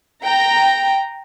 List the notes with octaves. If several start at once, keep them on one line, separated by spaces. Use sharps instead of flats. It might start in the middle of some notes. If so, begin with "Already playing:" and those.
G5 A#5